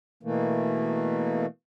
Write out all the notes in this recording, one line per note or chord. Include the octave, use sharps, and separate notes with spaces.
B2 E3 A3 A#3